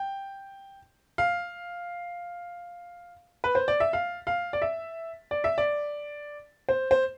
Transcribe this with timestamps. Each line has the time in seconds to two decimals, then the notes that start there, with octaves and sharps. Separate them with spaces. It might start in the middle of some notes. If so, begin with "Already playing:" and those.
Already playing: G5
1.18 F5
3.44 B4
3.55 C5
3.68 D5
3.80 E5
3.93 F5
4.27 F5
4.53 D5
4.62 E5
5.31 D5
5.44 E5
5.58 D5
6.69 C5
6.91 C5